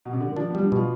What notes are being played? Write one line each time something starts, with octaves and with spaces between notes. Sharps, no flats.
B2
C3
D3
D#3
F3 D4
G3 B3
D4
B2 F4